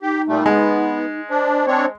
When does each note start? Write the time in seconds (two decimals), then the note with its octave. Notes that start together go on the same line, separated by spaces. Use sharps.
0.02 D#4 G4
0.28 A#2 G3 A3
0.46 G#3 B3
1.30 D4 C5
1.67 C4 D4 C#5